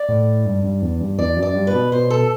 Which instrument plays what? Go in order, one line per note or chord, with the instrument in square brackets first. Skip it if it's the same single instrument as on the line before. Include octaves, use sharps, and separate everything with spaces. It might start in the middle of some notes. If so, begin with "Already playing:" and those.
Already playing: [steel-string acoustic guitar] D5
[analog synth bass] A2
G2
G2
E2
G2
[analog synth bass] E2 [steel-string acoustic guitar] D5
[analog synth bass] F#2
[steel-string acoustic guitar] D5
[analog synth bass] G2
[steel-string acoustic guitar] B4
[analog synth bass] B2
[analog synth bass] B2 [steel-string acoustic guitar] C5
[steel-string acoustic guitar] A4